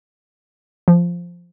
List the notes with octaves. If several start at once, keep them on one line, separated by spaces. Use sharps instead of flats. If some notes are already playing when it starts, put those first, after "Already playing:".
F3